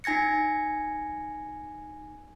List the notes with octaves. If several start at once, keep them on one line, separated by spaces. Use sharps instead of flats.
D#4 G#5 G#6 A#6 C#7